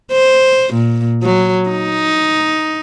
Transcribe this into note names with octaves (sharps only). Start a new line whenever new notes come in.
C5
A#2
F#3
D#4